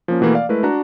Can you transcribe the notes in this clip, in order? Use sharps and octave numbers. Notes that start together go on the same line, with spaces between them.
F3 A#3 C#4
B2 E3 A3 A#3
D5 F5
G#3 A3 E4 A#4 B4
D4 F#4 A#5 F#6